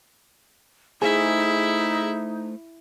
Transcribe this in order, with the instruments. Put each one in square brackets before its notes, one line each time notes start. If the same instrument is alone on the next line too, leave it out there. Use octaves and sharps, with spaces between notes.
[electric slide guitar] A3 C5 G#5 [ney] D#4 [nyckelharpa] E4 E5 [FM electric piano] G#4